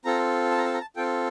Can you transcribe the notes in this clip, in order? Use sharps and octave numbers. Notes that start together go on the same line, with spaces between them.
C4 F4 A4 A#5
A5
A#5
A5
A#5
A5
C4 F4 A4 G5